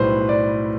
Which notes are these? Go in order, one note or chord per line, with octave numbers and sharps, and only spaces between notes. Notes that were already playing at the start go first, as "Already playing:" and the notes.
Already playing: B1 A2 G3 B4 C5
D5